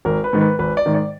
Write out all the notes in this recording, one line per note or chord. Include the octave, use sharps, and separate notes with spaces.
G#1 A#4
B4
G#2 D#3
B4
G#1 B4
D5
G#2 D#3
D5